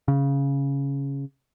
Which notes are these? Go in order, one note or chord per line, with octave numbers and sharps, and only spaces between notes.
C#3